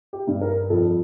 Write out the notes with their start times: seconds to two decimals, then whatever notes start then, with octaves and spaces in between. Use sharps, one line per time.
0.13 G4
0.27 G2
0.41 A#4
0.70 F2 A4